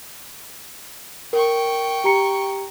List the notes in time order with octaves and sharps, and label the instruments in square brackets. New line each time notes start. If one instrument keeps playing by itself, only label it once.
[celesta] A#4 [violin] G5 C#6
[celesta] G4 A#5 C#7